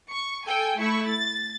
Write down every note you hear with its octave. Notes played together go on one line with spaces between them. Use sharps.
C#6
A4 G5 G#5
A3 E4 C#6
A6